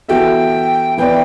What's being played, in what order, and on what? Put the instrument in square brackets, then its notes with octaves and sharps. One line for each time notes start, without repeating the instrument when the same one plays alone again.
[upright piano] E3 B3 F#4 A4 E5 [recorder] G5
[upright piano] E3 B3 E4 B4 D5 [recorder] G5